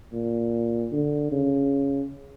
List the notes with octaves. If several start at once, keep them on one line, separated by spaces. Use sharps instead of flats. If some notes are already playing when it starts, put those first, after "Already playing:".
A#2
D3
C#3